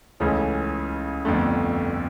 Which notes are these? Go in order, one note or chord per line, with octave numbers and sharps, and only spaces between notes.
C#2 C#3 E3 A3 C#4
G1 F2 D3 A3